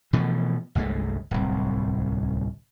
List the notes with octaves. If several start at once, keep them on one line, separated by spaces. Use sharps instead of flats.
B2 E3 F3 A3
G1 C2 G#3 A3
D1 C2